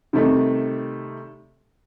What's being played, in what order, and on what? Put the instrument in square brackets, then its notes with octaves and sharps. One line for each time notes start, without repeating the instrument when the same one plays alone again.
[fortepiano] C3 D#3 G3 A3 D#4 A4